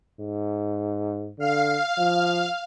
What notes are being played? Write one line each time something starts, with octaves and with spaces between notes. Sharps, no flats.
G#2
D3 F5
F3